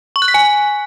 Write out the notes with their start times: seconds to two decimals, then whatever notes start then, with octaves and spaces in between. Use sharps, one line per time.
0.16 C#6
0.22 F#6
0.28 B6
0.34 G#5